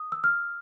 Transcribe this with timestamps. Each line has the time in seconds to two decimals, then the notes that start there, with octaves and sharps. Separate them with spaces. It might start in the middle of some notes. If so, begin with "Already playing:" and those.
Already playing: D#6
0.12 E6
0.24 F6